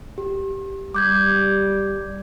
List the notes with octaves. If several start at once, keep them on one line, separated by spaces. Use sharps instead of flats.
G4
G3 D6 G6 G#6